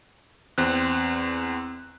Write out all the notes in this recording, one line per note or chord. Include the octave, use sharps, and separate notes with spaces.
E2 C4 F#6